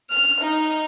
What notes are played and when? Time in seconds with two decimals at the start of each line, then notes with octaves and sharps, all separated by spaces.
0.11 F6
0.42 D#4